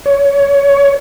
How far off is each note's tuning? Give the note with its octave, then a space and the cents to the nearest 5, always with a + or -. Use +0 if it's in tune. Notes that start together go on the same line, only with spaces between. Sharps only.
C#5 +20